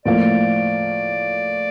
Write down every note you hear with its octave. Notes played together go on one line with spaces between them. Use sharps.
A2 F3 A#3 D5